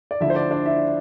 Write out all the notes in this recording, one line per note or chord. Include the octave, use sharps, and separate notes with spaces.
D5
D2 D3 F3 E4 E5
C5
D4 D5
D4 D5
E4 E5